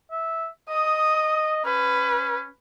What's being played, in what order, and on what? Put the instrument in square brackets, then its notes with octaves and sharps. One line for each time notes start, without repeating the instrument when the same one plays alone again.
[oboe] E5
[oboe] D#5 [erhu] D#6
[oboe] C#4 [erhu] B4